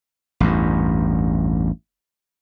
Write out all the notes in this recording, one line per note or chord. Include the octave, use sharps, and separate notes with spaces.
A1 E2 G2